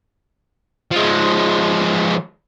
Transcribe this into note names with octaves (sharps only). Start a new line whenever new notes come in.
F3 G#3